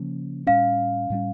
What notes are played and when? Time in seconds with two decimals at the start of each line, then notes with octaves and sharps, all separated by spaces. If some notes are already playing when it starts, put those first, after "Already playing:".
Already playing: C#3 F3 A#3 C#4
0.47 A2 G3 C#4 F5
1.10 A2 G3 C#4